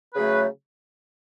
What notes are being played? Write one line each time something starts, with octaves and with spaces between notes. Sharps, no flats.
C#3 F#3 A3 G#4 B4